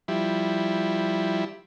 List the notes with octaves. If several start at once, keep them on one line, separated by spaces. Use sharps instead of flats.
F3 G3 E4